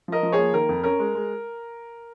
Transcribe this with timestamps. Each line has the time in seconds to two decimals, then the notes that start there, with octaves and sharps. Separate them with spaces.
0.08 F3 A#4 D#5
0.23 F3
0.32 G#4 C#5
0.38 A#3
0.53 D#3 A#4
0.69 F2
0.84 C#4 A#4
0.99 G#3
1.15 G#3